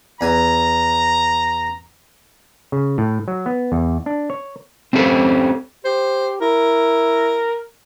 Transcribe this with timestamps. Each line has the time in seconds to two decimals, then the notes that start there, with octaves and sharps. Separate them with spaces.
0.21 E2 G#5 A#5
2.72 C#3
2.98 A2
3.28 F#3
3.46 B3
3.72 E2
4.06 D4
4.30 C#5
4.93 C4 C#4 G4 A4 C5
5.85 G4 C5
6.41 E4 A#4